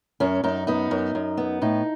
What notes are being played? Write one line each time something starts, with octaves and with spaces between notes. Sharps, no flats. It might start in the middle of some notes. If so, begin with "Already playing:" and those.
F#2 C#4
F#2 D#4
B3 D#4
F#2
F#2
B3
A2 D#4